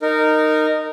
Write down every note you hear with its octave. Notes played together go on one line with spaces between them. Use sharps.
D#4 A#4